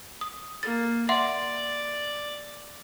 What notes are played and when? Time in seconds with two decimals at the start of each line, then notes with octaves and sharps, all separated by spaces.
0.21 D#6
0.63 A#3 A6
1.09 D5 E5 F#5 C6